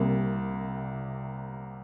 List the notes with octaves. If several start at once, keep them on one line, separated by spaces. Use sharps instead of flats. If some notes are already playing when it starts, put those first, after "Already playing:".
Already playing: C2 C3 G3 A#3